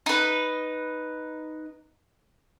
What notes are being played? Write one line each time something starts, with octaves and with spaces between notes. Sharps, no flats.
D#4 B4